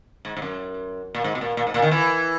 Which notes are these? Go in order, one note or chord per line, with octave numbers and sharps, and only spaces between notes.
G#2
G#2
F#2
A#2
G#2
B2
A#2
A#2
G#2
A#2
D#3
E3